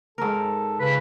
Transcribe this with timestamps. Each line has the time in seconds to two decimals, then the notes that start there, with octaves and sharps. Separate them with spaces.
0.18 G#2 A4 A#4
0.80 C#3 B4